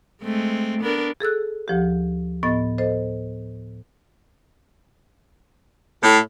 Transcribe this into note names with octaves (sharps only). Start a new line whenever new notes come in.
G#3 A3 C4
B3 D4 A#4
G#4 A4 E6 F#6
D2 F3 G4
A2 B3 D#5 A6
A4 C5 D#5
A2